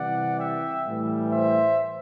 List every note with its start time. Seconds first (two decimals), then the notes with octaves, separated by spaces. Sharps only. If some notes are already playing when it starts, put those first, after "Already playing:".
Already playing: C3 E3 G3 D5 F#5
0.38 E5 G5
0.85 A2 E3 G3
1.30 C5 E5